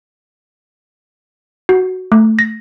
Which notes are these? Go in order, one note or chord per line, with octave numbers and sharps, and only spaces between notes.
F#4
A3
A#6